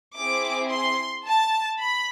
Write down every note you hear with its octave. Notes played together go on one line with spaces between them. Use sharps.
C4 E4 G#4 D6
C6
A5
B5